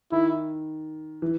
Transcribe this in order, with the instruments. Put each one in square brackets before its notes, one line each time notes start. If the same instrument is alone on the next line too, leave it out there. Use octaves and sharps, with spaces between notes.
[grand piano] D#3 [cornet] E4
[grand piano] E3